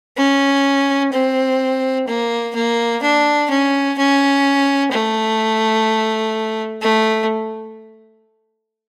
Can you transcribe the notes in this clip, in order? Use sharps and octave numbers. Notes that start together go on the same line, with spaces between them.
C#4
C4
A#3
A#3
D4
C#4
C#4
A3
A3